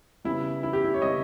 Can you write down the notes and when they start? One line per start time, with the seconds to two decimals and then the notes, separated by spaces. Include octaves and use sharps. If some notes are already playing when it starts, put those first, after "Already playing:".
0.24 C#3 G3 B3 E4
0.63 E4
0.73 G4
0.84 E4
0.94 C#5
1.02 C#3 G3 B3 D#5